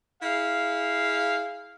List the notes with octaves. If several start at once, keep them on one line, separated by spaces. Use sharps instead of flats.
E4 G#4 F5